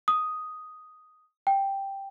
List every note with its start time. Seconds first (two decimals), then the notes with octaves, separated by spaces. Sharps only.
0.08 D#6
1.47 G5